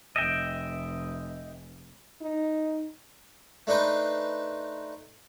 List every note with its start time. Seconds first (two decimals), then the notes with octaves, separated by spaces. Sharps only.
0.16 F1 D#5 E5 G5
2.22 D#4
3.67 A3 D4 D#4 B4 C5